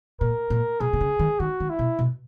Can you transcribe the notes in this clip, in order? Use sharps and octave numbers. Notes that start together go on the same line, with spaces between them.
A#2 A#4
A#2
B2 G#4
B2
C#3
D#3
D#3 F#4
D#3
E4
B2
B2